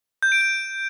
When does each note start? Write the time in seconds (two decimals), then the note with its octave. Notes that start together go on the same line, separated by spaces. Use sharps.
0.23 G6
0.32 D7
0.41 G6